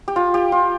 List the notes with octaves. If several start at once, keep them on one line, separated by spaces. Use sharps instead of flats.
G4
F4
G4
F4